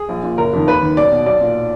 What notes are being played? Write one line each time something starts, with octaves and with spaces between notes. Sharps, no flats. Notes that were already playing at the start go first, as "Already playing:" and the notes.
Already playing: G#4
A#1
A#2
F#1 A#4
F2 D#3
D#2 B4
D#3
B1 D5
B2
B1 D5
A#2